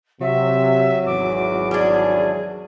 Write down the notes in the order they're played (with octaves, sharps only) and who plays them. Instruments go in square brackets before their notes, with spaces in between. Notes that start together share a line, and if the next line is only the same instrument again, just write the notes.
[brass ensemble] C3 [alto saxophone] F#3 [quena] E5
[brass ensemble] G#1 E2 [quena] D6
[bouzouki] G3 D4 [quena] G#4